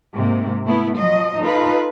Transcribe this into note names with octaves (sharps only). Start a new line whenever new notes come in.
G#2 C3 A#3
A3 B3 E4
F3 F#3 D#5
D#4 F4 A4 B4